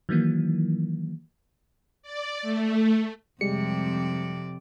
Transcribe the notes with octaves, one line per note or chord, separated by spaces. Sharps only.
D#3 E3 F#3 A#3
D5
A3
F2 C3 G3 G#3 D5 C#7